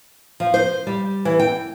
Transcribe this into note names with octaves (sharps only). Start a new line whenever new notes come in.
F3
C5
G3
E3
G5